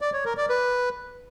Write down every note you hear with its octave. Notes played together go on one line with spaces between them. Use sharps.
D5
C#5
A#4
D5
B4